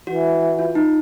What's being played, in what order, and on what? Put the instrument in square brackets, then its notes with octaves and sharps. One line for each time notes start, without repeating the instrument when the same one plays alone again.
[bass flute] E3 [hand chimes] F#4
[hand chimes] F4
D#4